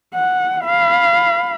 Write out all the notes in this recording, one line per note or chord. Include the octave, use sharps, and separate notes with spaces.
F#5
F5 B5